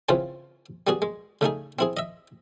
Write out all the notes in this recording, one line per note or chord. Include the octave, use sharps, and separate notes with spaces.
C#3 E3 C4 C#4 F4 C5
G3 B3 F#4 G#4
G#3
C#3 A3 D#4 G#4
C4 E4 G#4
D#5 E5